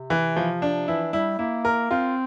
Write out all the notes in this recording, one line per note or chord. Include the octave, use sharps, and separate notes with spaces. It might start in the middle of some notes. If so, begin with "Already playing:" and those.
Already playing: C3
E3
F3
D4
E3 E4
G3 E4
A#3 E4
A#4
C4 F4